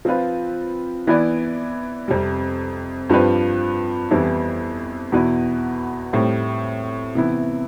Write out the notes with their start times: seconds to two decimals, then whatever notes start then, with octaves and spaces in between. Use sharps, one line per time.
0.05 F3 C4 F4 B4
1.07 E3 B3 E4 B4 D5
2.08 F2 C3 G3
3.09 G2 F3 C4 G4 B4
4.11 F2 E3 G3 B3 E4
5.12 E2 B2 B3 E4 B4
6.13 A2 G3 C4
7.15 C3 E3 B3 E4